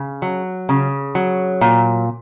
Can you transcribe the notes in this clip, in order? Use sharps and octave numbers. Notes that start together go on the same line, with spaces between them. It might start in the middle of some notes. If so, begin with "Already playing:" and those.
Already playing: C#3
F#3
C#3
F#3
A#2